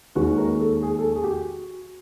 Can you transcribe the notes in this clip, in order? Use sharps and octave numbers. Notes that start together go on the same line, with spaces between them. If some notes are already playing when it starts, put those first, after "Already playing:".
D#2 D#3 G#3 C#4 F#4 B4
A#4
A4
G#4
A4
G#4
G4
F#4